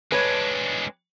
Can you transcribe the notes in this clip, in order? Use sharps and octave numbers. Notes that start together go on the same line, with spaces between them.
G#3 D4 B4 C#5